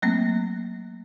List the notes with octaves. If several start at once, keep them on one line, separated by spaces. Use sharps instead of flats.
F#3 A3 A#3 C4